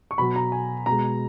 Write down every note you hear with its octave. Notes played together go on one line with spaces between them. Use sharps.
C#6
B2 F#3 B5
A#5
G#5
B2 G#3 A#5